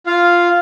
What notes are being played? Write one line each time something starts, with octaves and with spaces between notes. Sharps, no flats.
F4 F5